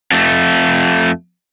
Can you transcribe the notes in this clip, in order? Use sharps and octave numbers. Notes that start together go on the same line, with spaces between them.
F2 A3